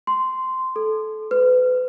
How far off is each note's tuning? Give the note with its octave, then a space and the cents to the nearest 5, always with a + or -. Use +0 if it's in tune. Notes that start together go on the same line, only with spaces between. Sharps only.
C6 -10
A4 -20
B4 +35